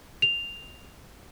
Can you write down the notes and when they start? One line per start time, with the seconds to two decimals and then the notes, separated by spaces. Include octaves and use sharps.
0.22 F7